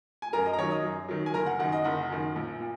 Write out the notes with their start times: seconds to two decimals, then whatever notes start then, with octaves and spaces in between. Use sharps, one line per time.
0.22 G#5
0.33 F#2 A#4 A#5
0.46 D#5 D#6
0.53 A#5
0.58 D#3 F#3 C#5 C#6
0.71 D#5 D#6
0.84 F#2
1.08 D#3 F#3
1.26 G#5
1.34 F#1 A#4 A#5
1.46 F#5
1.59 F#2 D#3 F#5
1.72 D#5
1.84 F#1 F#5
2.10 F#2 D#3
2.36 A#1
2.60 A#2